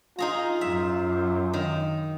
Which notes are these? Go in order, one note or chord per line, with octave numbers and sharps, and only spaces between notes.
D#4 F4 G#4 A#5
F#2 E5
D#3